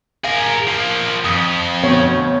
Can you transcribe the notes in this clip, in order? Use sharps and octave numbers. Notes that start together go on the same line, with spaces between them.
G#4 A#4 F5
F3 A#3
F2 D#6
D2 B2 C#5